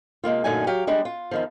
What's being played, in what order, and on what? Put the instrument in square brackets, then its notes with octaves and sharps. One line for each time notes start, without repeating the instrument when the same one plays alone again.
[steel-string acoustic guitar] C3 G#3 A#3 F4
F#2 A#2 D3 A3 D#4 G#5
F#3 G4 F5
G3 G#3 D4
F4
E2 D#3 F3